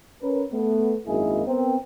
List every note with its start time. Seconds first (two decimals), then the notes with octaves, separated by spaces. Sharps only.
0.22 C#4 A#4 B4
0.52 A3 B3
1.07 G#1 F#2 G#3 A#3 E4 G#4
1.46 B3 C4 A#4